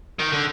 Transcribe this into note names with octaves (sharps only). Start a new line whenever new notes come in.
D#3
D3